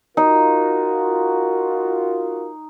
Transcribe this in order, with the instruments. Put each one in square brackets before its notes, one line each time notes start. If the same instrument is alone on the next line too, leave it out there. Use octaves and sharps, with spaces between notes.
[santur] D#4 [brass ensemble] F4 F#4 A#4